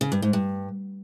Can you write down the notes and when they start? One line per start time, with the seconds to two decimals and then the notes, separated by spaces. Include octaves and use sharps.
0.01 C#3
0.12 G2
0.22 G#2
0.33 G2